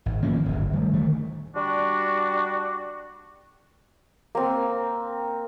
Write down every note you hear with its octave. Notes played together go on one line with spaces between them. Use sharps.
G#1
D#3 F3 A#3 C#4
D1 G1
D#3 G3 A3
D3 D#3 A3
G3 D4 F#4
A#3 C4